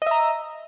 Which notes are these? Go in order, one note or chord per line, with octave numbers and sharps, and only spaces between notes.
D#5 E5 A#5